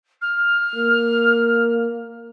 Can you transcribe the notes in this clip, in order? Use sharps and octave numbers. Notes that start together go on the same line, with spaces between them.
F6
A#3